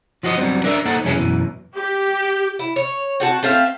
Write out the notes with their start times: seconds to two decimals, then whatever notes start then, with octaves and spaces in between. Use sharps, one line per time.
0.23 F3 F#4 C5 D#5
0.38 F#3 G3 B3 C4
0.64 D4 A#4 D5 E5
0.85 A#3 D#4 A4 C5 F#5
1.04 C2 F2 F#3 C#4 E4 G#4
1.16 F#2 B2 E3
1.75 G4
2.59 E4
2.76 C#5
3.20 C4 F#4 A5
3.43 A3 C4 E5 F5